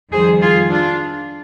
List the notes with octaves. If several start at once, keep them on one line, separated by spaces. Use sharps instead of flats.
F2 D#3 G3 G#4 C5
F4 G#4
D4 F4